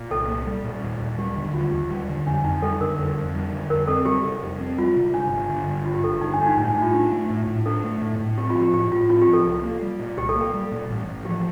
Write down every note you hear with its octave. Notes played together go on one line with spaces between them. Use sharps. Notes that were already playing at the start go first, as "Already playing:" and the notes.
Already playing: A#2
C2 A4
A#3
G3
A#2
D#2
D#2
G3 G4
D3
D#2 F4
D#2 G4
G3 G4
D3
F2 D4
F2 D#4
G3 A4
D3 A#4
F2
F2
G3
D3
F2 A#4
C4 A4
G3 G4
C3
F2
C4
G3 F4
C3
G1 D4
G1
D3
G2
G1 F4
G4
G1 A4
G4
D3 D#4
D4
G2
D#4
A2 D4
D#4
A2
F4
D4 G4
A3
A2
A2
D4 A4
A3
A2
A2
C4 G4
F4
F3
G4
A2 G4
A2 F4
C4 F4
G4
F3
A4
C2
A#3
G3
A#2
C2 G4
A4
A#3
A4
G3
A#2
A1
A1
F3 G4